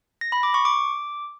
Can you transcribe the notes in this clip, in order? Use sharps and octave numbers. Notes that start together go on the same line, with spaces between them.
A#6
B5
D6
C#6
D6